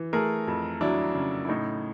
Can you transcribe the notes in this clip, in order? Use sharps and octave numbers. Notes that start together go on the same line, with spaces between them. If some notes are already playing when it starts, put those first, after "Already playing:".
Already playing: E3
A3 G#4 A#4
F2
F#3 D4 E4
C#3
E4
A2 D#4